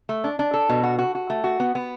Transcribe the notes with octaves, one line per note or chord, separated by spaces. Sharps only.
A3
D4
D4
A4
B2
F#4
F#4
F#4
A3
F#4
B3
B3